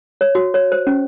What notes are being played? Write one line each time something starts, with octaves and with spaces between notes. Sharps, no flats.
C#5
F#4
C#5
C5
C#4